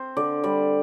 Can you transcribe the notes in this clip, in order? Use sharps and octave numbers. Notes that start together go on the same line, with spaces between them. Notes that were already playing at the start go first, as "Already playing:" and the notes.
Already playing: C4 C5
D3 D5
G3 D5